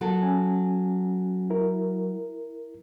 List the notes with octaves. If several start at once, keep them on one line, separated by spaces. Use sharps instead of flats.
F#3 A4
C#4 G#5
E4 A#4